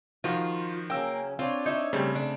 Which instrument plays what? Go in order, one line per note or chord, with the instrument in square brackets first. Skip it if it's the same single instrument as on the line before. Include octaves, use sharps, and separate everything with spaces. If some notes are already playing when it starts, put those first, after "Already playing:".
[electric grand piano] D#3 F3 F#4 [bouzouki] F4
[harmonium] C#3 F#3 C#4 [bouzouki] A#3 [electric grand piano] G5 E6
[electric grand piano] C4 [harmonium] D4 C#5 [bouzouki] F4
[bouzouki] D#4 E5
[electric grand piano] C#3 A3 C4 [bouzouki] G3 A5
[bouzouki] D4